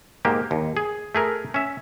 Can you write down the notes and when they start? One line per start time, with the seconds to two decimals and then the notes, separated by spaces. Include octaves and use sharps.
0.25 G#2 A#3 G4
0.51 D#2
0.77 G#4
1.15 A3 G#4 A#4
1.54 C#4 E5